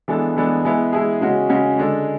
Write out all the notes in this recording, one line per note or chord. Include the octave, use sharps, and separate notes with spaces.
E3 G#3 B3 D4 A4
E3 G#3 B3 D4 A4
G#3 B3 E4 G#4
G#3 B3 E4 G#4
C#3 G#3 C#4 F#4
C#3 G#3 C#4 F#4
D3 G#3 D4 A4